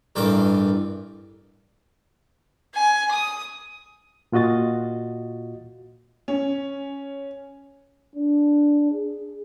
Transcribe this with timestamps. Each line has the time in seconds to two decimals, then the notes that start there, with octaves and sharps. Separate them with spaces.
0.16 A1 G2 E3 A#4 G5
2.74 G#5
3.11 D#6
4.32 A#2 F4 F#4 D#5 A6
6.28 C#4
8.15 D4
8.92 G#4